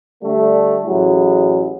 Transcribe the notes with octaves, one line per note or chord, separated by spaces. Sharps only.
D3 G3 A3
A1 F#3 E4 G#4